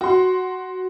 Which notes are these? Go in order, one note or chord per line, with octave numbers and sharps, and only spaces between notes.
F#4 C6